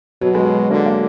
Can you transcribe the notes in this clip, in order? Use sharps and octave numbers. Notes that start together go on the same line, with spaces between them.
B2 F#3
G#3
F#3
D3 A#3
A#3